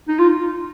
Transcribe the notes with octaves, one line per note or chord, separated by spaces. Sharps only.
D#4
F4